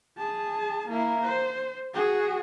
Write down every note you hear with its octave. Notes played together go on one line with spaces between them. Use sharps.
G#4 A5
A#3 E4
C5
F#4 G#4